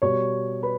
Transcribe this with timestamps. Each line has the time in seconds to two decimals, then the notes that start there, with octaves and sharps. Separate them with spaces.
0.02 B2 G3 C#5 C#6
0.63 B4 B5